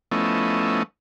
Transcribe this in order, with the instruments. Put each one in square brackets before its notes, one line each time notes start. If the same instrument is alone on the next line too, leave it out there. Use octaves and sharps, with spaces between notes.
[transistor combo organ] F3 A3 B3 C#4 E4 D#5